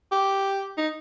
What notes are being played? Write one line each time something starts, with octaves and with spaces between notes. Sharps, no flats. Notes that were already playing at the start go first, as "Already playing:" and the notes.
G4
D#4